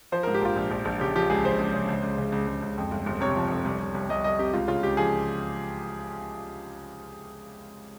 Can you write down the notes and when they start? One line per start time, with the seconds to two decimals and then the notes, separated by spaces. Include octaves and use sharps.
0.12 F3 C5
0.23 G#2 A#4
0.34 G4
0.42 A#1 F4
0.56 A#1
0.71 A#1
0.85 A#1
1.00 C#3 G4
1.15 F3 G4
1.30 C#2 G#4
1.45 C#3 C5
1.59 C#2
1.74 C#3
1.89 C#2
2.03 C#2
2.18 C#3
2.32 C#2
2.47 C#2
2.62 C#2
2.78 F2
2.91 G1
3.06 G1
3.21 C3 C#5
3.36 F3
3.50 F2
3.65 C2
3.80 C2
3.94 C2
4.09 C2 D#5
4.24 C2 D#5
4.39 C3 G4
4.53 C#2 F4
4.68 C#3 F4
4.83 C#2 G4
4.97 F3 G#4